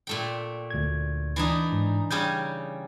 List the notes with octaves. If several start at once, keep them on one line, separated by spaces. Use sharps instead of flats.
A#2 A3 G5
D2 G#6
E3 D4 D#4
G#2
C#3 G3 C#4 G6